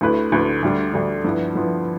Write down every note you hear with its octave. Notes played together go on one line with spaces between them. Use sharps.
D2 D3 A3 E4 B4
D2 D3 A3 E4 B4
D2 D3 G3 D4
D2 D3 G3 D4
G2 F3 B3 E4
G2 F3 B3 E4